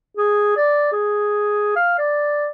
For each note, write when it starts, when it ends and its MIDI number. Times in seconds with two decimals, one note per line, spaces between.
0.17 0.56 68
0.57 0.91 74
0.92 1.71 68
1.76 1.93 77
1.98 2.48 74